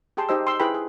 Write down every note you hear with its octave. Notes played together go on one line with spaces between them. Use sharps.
G4 G#4 G5 A5 C6
D#4 G4 C5 D#5 E6
C6 E6
E4 G#4 B4 G5 B5
G#4